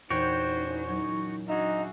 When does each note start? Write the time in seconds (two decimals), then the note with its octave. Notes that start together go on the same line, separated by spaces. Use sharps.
0.10 E2 A#2 D4 D#4 F#4 C5 C#5 G5
0.56 C#4
0.88 F#3 D#4
1.48 D4 D#4 F#4 G#4 E5